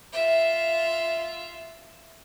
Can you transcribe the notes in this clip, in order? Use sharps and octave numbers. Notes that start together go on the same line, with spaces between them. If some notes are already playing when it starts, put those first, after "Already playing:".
F4 E5